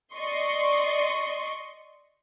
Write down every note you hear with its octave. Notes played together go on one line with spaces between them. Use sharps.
D5 D#5 C6 C#6